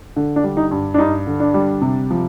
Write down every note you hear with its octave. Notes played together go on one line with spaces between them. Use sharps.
D3
D4
G3
D#4
G2
D4
G2 D#4
D3
D4
G3
C3
F3